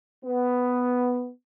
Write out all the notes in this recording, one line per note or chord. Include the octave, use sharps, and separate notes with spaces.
B3